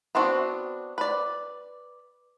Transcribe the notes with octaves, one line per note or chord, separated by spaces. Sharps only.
B3 C4 D4 F#4
B4 D5